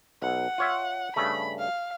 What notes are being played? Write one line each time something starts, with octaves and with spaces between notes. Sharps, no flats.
B1 F#5
F4 C#5 E5
G2 C#3 A3 B5
F5